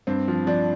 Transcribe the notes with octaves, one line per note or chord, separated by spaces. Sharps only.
G2 C4
F3
F3 D4